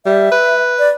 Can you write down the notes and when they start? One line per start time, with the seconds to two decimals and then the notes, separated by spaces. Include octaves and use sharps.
0.06 G3 E5
0.32 B4
0.79 D5